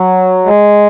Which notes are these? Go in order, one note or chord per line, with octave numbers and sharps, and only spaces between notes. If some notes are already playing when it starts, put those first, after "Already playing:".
Already playing: F#3
G#3